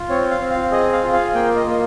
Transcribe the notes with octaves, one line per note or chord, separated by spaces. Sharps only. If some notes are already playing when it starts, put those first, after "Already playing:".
Already playing: F4
C4 C#5
F5
C4
F5
G#4 D#5
F5
F4
F5
A#3 G5
D#5
A#3
D#5